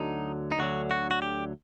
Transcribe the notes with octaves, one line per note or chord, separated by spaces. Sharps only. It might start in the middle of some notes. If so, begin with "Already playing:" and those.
Already playing: D2 D3 F#3 D#4
D#4
D2 D3 F#3 F#4
F#4
F#4
G4